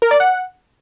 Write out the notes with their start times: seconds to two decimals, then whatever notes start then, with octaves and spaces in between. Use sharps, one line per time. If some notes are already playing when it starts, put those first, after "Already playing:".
0.02 A#4
0.11 D5
0.20 F#5